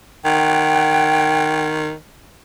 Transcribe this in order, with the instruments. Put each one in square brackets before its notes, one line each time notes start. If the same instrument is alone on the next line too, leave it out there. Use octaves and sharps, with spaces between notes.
[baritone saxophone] D#3 [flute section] F#5 G5 G#6